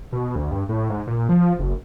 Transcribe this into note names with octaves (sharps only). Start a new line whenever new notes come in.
B2
D2
G2
A2
G#2
A#2
F3
F#1